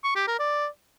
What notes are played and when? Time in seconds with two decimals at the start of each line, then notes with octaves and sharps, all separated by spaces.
0.04 C#6
0.16 G4
0.27 A#4
0.39 D5